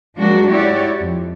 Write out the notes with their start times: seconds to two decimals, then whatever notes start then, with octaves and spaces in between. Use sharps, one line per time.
0.17 F3 F#3 G#3 A#3 D4 F#4
0.48 G#2 E4 F#4 G4 C#5 D5
1.00 F2